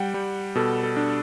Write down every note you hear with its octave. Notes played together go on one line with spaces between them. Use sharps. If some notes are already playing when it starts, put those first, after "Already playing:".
Already playing: G3 F#5 G5
G3
B2 A4
A4
D4